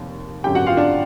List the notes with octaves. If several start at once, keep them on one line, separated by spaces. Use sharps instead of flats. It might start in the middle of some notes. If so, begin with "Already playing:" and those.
Already playing: F1 D#2
G#1 F#2 D3 G4 G5
F#4 F#5
F4 F5
D4 D5